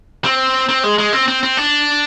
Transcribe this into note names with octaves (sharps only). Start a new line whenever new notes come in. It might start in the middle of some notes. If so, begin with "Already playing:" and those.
C4
C4
G#3
G#3
C4
C4
C4
D4